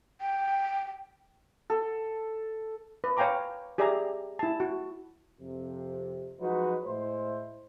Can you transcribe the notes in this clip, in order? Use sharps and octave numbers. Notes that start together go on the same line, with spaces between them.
G5
A4
B4
C#5 F5 G5 G#5 A#5 D6
G4 G#4 D5 E5 G#5 A#5
E4 A5
F#4
F2 C3
F3 F#3 G#3 D#4 F#4 B4
A2 G#3 E4 C5